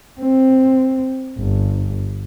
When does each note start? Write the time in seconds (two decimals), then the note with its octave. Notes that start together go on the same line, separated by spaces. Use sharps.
0.21 C4
1.39 G1